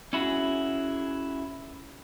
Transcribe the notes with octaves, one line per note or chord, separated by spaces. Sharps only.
C#4 E4 F#4 G#4